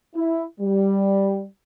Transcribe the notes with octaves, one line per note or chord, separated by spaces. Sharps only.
E4
G3